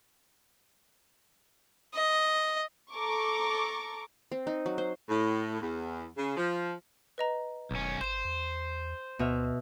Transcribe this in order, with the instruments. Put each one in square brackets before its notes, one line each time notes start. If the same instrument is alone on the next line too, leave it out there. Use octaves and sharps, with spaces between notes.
[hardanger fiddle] D#5
[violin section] A4 A#5 C#6 D6
[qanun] C4
D#4
F#3
C5
[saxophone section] A2
E2
C#3
F3
[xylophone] B4 D#5 A#5
[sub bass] E1 [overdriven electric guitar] B1 C#4
[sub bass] G#1 [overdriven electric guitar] C5 [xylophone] G6 E7
[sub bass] E2
[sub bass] D2 [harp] B2 E5 F6